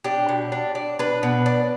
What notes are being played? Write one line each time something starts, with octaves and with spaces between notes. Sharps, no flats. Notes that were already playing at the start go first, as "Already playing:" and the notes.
D4 G4
B2
D4
D4
D4 B4
B2
D4